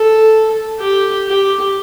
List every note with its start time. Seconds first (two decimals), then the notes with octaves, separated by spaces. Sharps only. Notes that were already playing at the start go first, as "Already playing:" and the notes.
Already playing: A4
0.80 G4
1.27 G4